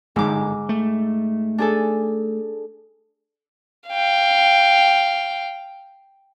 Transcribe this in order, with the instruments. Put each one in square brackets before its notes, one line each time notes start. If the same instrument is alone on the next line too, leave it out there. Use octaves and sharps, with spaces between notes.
[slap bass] D1 G1 [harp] G#2 D6
[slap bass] A3
[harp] D4 G#4 A4
[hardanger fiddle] F5 G5